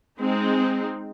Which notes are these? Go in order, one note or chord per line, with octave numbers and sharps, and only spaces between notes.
G#3 C4 D#4